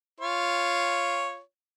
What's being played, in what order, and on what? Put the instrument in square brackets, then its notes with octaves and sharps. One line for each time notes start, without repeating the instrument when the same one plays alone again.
[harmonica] F4 C#5